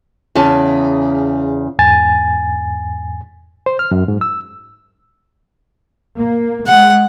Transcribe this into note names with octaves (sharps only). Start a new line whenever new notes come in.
E2 C#3 C#4 A5
E2 G#2 G#5 A6
C5
F6
F#2
G#2
E6
A#3
G#3 F#5